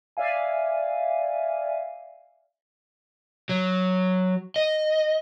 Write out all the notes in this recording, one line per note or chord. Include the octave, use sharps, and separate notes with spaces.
D5 E5 F5 G#5
F#3
D#5